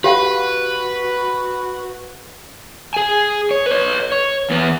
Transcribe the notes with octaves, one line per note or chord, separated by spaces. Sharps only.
F#4 G4 B4 F5 F#5
G#4 G#5
C#5
B4 C#5
C#5
E2 B3